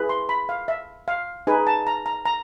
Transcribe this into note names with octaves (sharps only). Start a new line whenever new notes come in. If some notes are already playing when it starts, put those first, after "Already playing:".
Already playing: E4 G#4 B4
C6
B5
F5
E5
F5
D#4 G#4 B4 G#5
A5
A#5
A#5
A#5